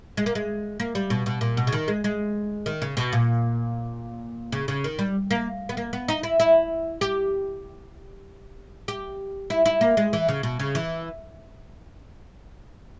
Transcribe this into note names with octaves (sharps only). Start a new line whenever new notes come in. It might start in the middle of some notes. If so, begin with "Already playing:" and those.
G#3
A#3
G#3
A#3
G3
B2
B2
A#2
B2
C#3
D#3
G#3
G#3
D#3
C#3
B2
A#2
C#3
C#3
D#3
G3
A#3
B3
A#3
B3
D#4
E4
E4
G4
G4
E4
E4
A#3
G#3
E3
C#3
B2
C#3
E3